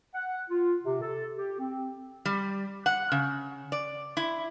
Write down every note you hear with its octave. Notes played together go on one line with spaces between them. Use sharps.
F#5
F4
C3
A4
G4
C4
G3
F#5
C#3
D5
E4